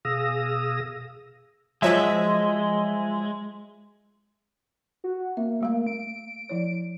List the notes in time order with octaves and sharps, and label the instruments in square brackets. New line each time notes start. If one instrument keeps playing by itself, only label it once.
[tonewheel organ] B2 G#4 F5 D#6 E6 A#6
[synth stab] F3 F#3 E5 [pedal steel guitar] G#3
[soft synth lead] F#4
[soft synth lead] A#3 [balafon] E5
[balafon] G3 A3 F5
[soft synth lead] D7
[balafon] F3 E4 C#5